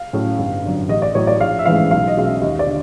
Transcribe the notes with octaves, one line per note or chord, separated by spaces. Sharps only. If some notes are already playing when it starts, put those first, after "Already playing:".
Already playing: F5
A2 F#3 A3 C#4
G1
F#2 D3
A1 D#5
D5
A2 F#3 C#5
D5
A#1 F5
E5
G#2 E3 A3 C#4 F5
B1 F5
D#5
B2 G#3 C#4 F5
E5
D#2 D#5
D5
D3